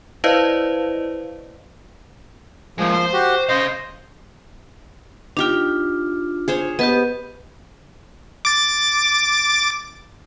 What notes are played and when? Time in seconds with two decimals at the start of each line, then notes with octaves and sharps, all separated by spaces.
0.24 E4 B4 C5 D5 D#5 F5
2.78 F3 G#3 A#3
2.92 C5
3.13 F#4 G4
3.49 C#3 C5 D#5 F5
5.37 D4 D#4 F4 G4 G5
6.48 G#4 C5 C#5
6.79 B3 G4 B4 D#5
8.45 D6 A6